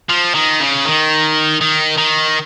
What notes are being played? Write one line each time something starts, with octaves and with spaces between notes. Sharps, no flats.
F3
D#3
C#3
D#3
D#3
D#3